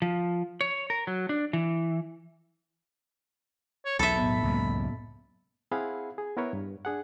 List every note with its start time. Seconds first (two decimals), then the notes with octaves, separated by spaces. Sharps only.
0.02 F3
0.61 C#5
0.90 A#4
1.07 F#3
1.29 D4
1.53 E3
3.85 C#5
3.99 B1 E2 A4 E5 B5
4.16 A2 B3
4.43 C#2 F#2 G#3 A#3
5.71 C4 E4 G#4 F5 F#5 B5
6.18 G#4
6.37 B3 E4 A#4 B4 C#5
6.53 G2
6.85 D4 G#4 F#5